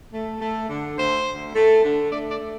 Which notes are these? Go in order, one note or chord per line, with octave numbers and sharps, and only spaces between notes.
A3
A3
D3
D2 C5
D2
A3
D3
A3 D5
D5
A3